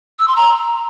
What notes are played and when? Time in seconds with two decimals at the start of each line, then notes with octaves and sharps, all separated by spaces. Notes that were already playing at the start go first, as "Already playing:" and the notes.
0.19 E6
0.28 C6
0.36 A#5